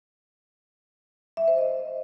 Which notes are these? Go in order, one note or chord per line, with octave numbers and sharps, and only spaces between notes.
E5
C5
D#5